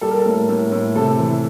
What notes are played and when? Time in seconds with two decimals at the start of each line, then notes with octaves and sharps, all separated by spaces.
0.01 G3 A4
0.11 A#4
0.19 A4
0.26 A2
0.49 A2
0.72 A2
0.95 C3 A4
1.19 E3